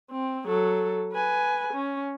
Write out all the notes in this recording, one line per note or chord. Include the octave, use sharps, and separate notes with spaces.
C4
F#3 A4
B4 G#5
C#4